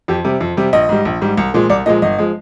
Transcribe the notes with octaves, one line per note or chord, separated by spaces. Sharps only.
F2 G4
C3 G3
F2
C3 G3
A#1 D#5
G#2 G3
A#1
G#2 G3
C2
A#2 F3 G#3
C2 D5
A#2 F3 G#3 D#5
G1 D#5
F3 G#3